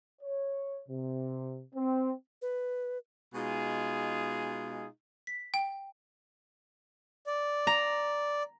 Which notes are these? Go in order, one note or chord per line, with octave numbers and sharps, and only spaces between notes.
C#5
C3
C4
B4
B2 G#3 D#4 F4 G#4
B6
G5
D5
A#5